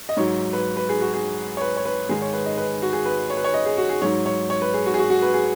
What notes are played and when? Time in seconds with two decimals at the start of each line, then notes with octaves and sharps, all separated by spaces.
0.09 D#5
0.17 G#2 F#3 C#5
0.53 B4
0.77 B4
0.89 G#4
1.01 F#4
1.14 G#4
1.57 C#5
1.61 B4
1.76 C#5
1.85 B4
2.09 G#2 D#3 G#3 G#4
2.22 C#5
2.33 B4
2.46 D#5
2.58 B4
2.82 F#4
2.93 G#4
3.06 B4
3.30 C#5
3.37 B4
3.44 C#5
3.54 D#5
3.66 G#4
3.77 F#4
3.89 G#4
4.02 G#2 F#3 C#5
4.26 C#5
4.50 C#5
4.62 B4
4.74 G#4
4.86 F#4
4.94 G#4
4.99 F#4
5.10 F#4
5.22 B4
5.34 G#4